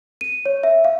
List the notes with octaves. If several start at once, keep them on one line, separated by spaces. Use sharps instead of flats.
D#7
C#5
E5
F5